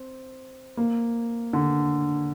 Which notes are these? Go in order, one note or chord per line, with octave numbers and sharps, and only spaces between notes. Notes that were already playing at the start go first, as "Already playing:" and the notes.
Already playing: C4
A#3
D3